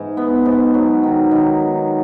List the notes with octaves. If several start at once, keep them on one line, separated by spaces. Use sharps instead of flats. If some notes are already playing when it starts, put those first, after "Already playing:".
Already playing: G#2 E3
B3
G#2
F#3
D#3
D#3
D#3